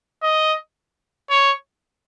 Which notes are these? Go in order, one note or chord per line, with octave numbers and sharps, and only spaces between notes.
D#5
C#5